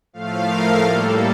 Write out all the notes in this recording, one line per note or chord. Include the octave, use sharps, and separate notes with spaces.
A2 F3 A3 F5
A#4
A2 G3 A#3 A4